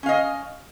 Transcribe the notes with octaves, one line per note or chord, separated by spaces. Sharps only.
C#4 D#5 F5